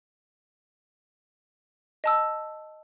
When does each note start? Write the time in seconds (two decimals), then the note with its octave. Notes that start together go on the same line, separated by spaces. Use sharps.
2.04 D#5 A5 E6